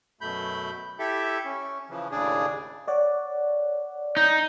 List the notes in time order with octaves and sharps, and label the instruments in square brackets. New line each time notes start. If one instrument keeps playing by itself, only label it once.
[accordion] F#2 B2 A3 B5 G6
E4 G4 A4 E5
C#4
C#3 E3 F3
D#2 A2 C#3 D4 G#4
[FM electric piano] C#5 D5 F#5
[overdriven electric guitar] D#4 [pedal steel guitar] G6